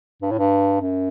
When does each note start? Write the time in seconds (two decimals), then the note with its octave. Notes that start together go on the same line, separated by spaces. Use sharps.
0.22 G2
0.31 A2
0.39 G2
0.81 F#2